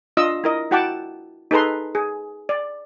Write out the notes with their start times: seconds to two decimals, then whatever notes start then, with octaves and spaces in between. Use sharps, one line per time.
0.17 D4 F4 D#5 E6
0.44 E4 A#4 D#5
0.71 E4 F#4 F#5 G5 A5 D6
1.51 D#4 G#4 A4 B4 A#5 C6
1.95 G#4
2.49 D5